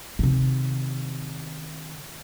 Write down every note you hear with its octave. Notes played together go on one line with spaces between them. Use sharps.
C3 D#3